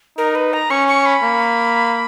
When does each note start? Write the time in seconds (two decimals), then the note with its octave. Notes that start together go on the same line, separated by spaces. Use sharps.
0.18 D#4 A#4
0.35 B4
0.53 A#5
0.70 C#4 C#6
0.88 C#6
1.06 B5
1.23 A#3